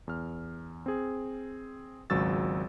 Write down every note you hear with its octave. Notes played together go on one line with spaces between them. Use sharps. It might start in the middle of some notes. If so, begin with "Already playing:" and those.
E2 F6
C4 G#4
G#1 C#2 F#3 C#6 E6 A6